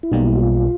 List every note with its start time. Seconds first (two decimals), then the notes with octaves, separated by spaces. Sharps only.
0.03 E4
0.12 B1 B2 G3 A#3 D#4
0.26 E4
0.35 F#4
0.40 F4